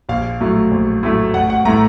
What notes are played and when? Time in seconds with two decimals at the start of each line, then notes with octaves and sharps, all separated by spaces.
0.09 A#1 F5
0.40 A2 F#3 A3
0.71 A#1
1.03 A2 F#3 A3
1.34 A1 F#5
1.50 F#5
1.65 A2 A3 A#5